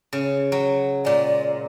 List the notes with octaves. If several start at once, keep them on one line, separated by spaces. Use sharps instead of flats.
C#3
F#3
A#2 G#3 D5